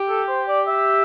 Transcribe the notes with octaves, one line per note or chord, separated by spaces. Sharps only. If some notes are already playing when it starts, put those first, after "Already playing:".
Already playing: G4
A4
C5
D5
E5